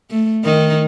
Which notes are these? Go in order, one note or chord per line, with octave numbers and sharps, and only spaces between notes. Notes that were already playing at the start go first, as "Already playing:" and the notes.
A3
D#3 D#4